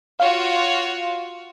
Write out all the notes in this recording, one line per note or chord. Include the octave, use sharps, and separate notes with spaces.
F4 F#4 C#5 F5